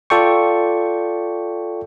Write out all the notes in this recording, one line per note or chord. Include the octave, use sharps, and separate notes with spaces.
F4 A4 D5 G5 C#6